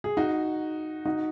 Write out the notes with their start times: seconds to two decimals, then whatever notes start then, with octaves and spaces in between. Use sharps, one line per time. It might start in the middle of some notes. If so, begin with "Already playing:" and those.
0.04 G#4
0.17 D#4 F#4
1.06 D#4 F#4